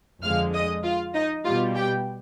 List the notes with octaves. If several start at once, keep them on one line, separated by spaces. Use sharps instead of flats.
F2 D3 G#3 F5 F6
D#5 D#6
F4 F5
D#4 D#5
B2 G3 F4 F5
G4 G5